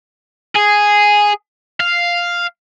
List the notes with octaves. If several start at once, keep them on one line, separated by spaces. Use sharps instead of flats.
G#4
F5